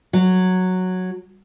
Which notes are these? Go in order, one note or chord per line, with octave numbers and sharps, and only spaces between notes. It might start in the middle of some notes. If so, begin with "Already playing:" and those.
F#3